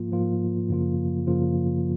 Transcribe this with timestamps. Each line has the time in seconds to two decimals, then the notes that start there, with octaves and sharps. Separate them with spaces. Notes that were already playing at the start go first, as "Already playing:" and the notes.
Already playing: G#2 F3 A#3 F4
0.12 G#2 F3 A#3 F4
0.70 F#2 C#3 F3 A#3 F4
1.27 F#2 C#3 F3 A#3 F4